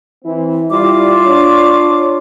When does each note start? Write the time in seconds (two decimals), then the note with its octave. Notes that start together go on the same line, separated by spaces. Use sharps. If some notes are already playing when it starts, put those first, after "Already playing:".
0.24 E3 C4 E4
0.70 G3 E4 F4 D6
1.24 D4 C#5